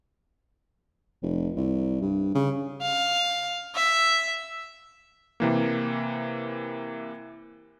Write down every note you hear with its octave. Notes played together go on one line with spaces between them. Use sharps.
F1
C2
G2
C#3
F5
E5
C3 E3 A#3